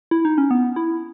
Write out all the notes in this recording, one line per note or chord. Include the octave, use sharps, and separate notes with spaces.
E4
D#4
C#4
B3
E4